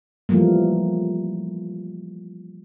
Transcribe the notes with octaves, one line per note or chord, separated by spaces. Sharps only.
E3 F3 G3 A3 A#3